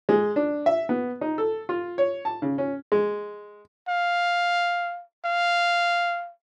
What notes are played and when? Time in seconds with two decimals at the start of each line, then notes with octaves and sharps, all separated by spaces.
0.09 G#3
0.36 D4
0.66 E5
0.89 B3
1.21 D#4
1.38 A4
1.69 F4
1.98 C#5
2.25 A5
2.42 C#3
2.58 C#4
2.92 G#3
3.88 F5
5.25 F5